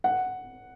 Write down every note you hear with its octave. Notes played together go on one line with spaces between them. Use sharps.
F#5